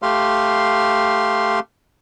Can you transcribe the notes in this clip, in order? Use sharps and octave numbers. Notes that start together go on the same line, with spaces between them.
A3 G4 F5 C6